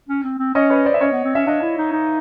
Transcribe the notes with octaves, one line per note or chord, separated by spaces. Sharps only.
C#4
C4
C4
C#4 C#5 D#5
B4 C#5
C5 D5
E5
C#4 C#5 D#5
B3
C4
C#4 E5
D4 D#5 F5
E4
D#4
D#4